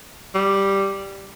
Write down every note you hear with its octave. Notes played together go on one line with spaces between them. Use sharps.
G3